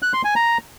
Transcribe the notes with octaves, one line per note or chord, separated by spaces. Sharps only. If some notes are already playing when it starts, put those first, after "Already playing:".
F#6
C6
G#5
A#5